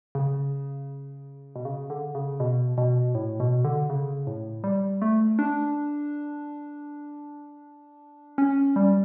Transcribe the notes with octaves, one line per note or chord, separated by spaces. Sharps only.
C#3
B2
C#3
D3
C#3
B2
B2
A2
B2
D3
C#3
A2
G3
A3
D4
C#4
G3